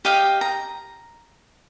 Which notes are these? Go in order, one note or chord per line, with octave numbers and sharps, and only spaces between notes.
G4 D#5 F5 G5
A#5